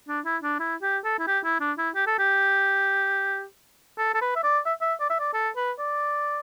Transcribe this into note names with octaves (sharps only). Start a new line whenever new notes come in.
D4
E4
D4
E4
G4
A4
E4
G4
E4
D4
E4
G4
A4
G4
A4
A4
B4
E5
D5
E5
E5
D5
E5
D5
A4
B4
D5